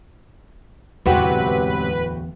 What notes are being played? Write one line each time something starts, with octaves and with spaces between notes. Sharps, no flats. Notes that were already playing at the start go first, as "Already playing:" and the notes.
D1 E2 G#2 C3 F#3 F#4 B4 G5